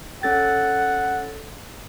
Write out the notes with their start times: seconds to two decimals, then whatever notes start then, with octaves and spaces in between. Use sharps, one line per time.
0.23 C#4 A4 F#5 A6